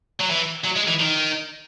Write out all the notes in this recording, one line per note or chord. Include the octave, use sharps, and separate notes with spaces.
F#3
E3
F#3
G#3
E3
D#3